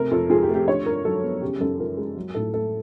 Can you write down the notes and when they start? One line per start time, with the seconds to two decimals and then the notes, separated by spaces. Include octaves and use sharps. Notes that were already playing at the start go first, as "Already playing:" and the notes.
Already playing: C3 A3 A#4
0.11 F2 A4
0.30 F3 G#4
0.43 G4
0.49 A3
0.55 G4
0.68 D3 C#5
0.86 G2 A#4
1.05 F#3 A4
1.23 B3
1.41 C#3 G4
1.60 F#2 A4
1.79 F3 A#4
1.97 G#3
2.16 F#3
2.34 A2 A4
2.54 A3 A4